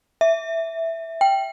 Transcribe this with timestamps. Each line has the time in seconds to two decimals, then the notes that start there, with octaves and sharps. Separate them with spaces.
0.21 E5
1.21 G5